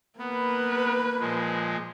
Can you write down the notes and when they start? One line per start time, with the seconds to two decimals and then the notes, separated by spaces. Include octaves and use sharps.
0.19 A#3 B3 B4
1.20 A#2 F3 G#3